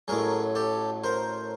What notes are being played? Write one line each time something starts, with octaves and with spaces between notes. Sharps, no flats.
A1 A2 F#3 G#4 A#4
G4 A4
A#4 C5